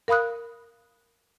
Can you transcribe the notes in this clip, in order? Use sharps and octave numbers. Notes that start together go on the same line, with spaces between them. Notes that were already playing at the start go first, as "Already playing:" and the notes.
A#4 F5 B5 D#6 F#6